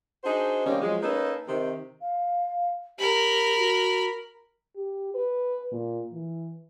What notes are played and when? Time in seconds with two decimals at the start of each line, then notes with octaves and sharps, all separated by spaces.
0.24 D4 D#4 F#4 G#4 C5
0.66 C3 D#3 G3 A#3 C#4
0.82 F3 F#3 G#3
1.02 A#3 C#4 D#4 A4 B4
1.48 C3 D#3
2.01 F5
2.98 G4 A#4 B5
3.57 F#4
4.76 G4
5.14 B4
5.72 A#2
6.12 E3